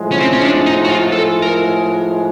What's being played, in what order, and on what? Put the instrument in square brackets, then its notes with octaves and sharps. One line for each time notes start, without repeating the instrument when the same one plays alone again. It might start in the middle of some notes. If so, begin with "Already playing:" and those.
Already playing: [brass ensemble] A2 F3 G#3
[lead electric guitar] C#4
C4
C#4
D4
D#4
F#4
F4
A4
A#4